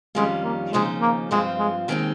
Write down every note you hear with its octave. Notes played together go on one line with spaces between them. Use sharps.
F2 D#3 G3 G#3 C#4 F4
A#3
D#2 C#3 F3 G#3 C4 D#4
A#3
G2 F3 G#3 C4 F4
G#3
D#2 D#3 G#3 C4 D#4